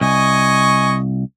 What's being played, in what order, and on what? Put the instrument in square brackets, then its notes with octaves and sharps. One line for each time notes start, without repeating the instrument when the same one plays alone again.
[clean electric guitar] C2 [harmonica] D#5 G#5 C#6